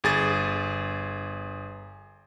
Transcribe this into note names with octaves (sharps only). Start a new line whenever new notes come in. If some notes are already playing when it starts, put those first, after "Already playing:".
G1 G#4 A6